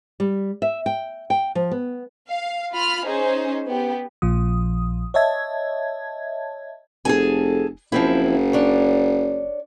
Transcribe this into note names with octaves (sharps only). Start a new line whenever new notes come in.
G3
E5
G5
G5
F3
B3
F5
F4 B5 F6
C#4 D#4 G#4 C5
B3 G4
A#1 A#2 F3 D#6
C#5 D#5 E5 A5 G#6
F1 G#4 A4 G#5
F#1 F3 C4 E4
D4 C#5